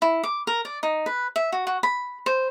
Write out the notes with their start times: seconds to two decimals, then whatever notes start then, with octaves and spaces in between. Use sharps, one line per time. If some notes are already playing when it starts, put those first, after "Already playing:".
0.02 E4
0.23 D6
0.47 A#4
0.65 D5
0.83 D#4
1.06 B4
1.36 E5
1.52 F#4
1.67 F#4
1.83 B5
2.26 C5